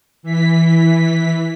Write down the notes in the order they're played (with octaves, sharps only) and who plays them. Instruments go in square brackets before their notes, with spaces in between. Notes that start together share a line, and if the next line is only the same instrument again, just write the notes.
[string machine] E3 B6